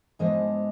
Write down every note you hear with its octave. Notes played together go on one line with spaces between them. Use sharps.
G#2 F3 G#3 B3 D4 D#5